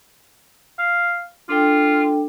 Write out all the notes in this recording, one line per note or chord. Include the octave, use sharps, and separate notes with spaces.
F5
D4 F4 A4 G5